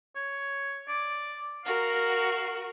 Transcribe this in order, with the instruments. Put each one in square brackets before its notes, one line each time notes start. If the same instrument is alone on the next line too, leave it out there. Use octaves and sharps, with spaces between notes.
[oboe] C#5
D5
[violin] F#4 A#4 [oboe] F5